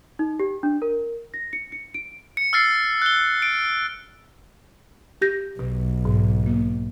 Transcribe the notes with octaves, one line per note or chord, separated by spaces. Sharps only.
D#4
G4
D4
A#4
A#6
C#7
C#7
D7
C#7
E6 F6 A6 C7
F#6 G7
D7
G4 G6 A#6
B1 B2
G#2
A#3